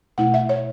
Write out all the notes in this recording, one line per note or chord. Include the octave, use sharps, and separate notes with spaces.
B2 A3 E4 F#5
E5
C#5